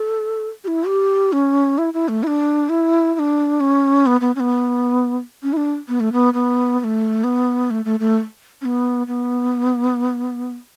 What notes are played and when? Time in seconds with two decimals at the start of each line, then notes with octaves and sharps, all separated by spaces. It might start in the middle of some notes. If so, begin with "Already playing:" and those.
Already playing: A4
0.64 G4
0.68 E4
0.87 G4
1.32 C#4
1.78 E4
1.93 E4
2.08 A3
2.23 E4
2.27 D4
2.69 E4
3.14 E4
3.19 D4
3.60 C#4
4.06 B3
4.21 B3
4.36 C#4
4.40 B3
5.43 C#4
5.53 E4
5.57 D4
5.88 B3
6.00 A3
6.12 B3
6.34 B3
6.79 B3
6.84 A3
7.24 B3
7.70 A3
7.85 A3
8.00 A3
8.61 C#4
8.65 B3
9.07 B3